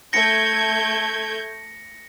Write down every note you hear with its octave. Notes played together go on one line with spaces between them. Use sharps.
A3 G6 G#6 A#6 C#7